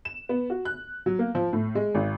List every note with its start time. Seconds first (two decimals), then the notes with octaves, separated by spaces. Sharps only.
0.05 E7
0.29 B3
0.50 F#4
0.65 F#6
1.06 F#3
1.19 A#3
1.35 F3
1.53 A2
1.75 G#3
1.95 G#1